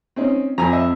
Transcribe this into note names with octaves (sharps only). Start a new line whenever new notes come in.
C4 C#4 D#4
F2 G#5 A#5
D#5 E5